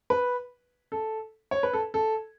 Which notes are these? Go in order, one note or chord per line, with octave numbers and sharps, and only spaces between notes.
B4
A4
C#5
B4
A4
A4